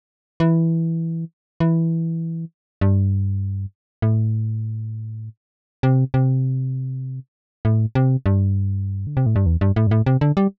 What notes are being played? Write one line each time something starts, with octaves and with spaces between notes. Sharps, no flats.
E3
E3
G2
A2
C3
C3
A2
C3
G2
D3
C3
A2
G2
E2
G2
A2
G2
A2
C3
D3
G3